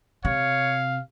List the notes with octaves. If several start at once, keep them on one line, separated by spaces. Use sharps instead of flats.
C3 C#5 F5